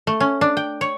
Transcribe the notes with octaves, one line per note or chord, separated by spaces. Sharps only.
A3
C#4
D4
G5
C#5